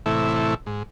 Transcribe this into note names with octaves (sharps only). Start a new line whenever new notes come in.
A2 C3 E3 A3 E4
G#2